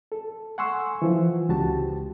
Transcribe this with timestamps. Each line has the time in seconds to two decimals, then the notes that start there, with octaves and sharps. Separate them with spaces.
0.12 A4
0.58 F#5 G#5 C6 C#6 E6
1.02 E3 F3
1.49 C#2 F#4 G4 A5